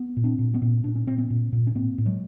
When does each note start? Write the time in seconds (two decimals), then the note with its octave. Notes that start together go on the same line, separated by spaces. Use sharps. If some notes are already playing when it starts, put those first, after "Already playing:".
Already playing: B3
0.17 A#2
0.24 C4 D4
0.39 A#2
0.54 B3 C#4
0.62 A#2
0.84 A#2 D4
0.96 C#4
1.07 A#2 C4
1.18 B3 C#4
1.30 A#2
1.53 A#2
1.67 C#4
1.75 A2 A#3 C4
1.98 A2
2.06 F#3 G#3